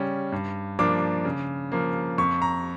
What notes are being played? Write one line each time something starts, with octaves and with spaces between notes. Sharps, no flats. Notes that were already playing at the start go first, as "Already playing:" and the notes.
Already playing: C#3 G3 C#4
G2
F3 A#3 D4 D6
C#3
F3 A#3
F2 C#6
A#5